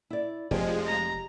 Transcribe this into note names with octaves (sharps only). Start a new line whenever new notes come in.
E4 D5
F1 F3 G#3 G4 G#4 D#5
A#5